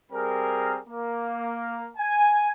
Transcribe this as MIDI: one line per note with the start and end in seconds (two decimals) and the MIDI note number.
0.12 0.78 55
0.12 0.78 60
0.12 0.78 68
0.12 0.78 70
0.88 1.89 58
1.97 2.49 80